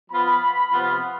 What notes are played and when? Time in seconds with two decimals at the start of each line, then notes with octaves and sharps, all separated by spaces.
0.11 F3 B3 F4 B5
0.72 C3 F3 B3 F4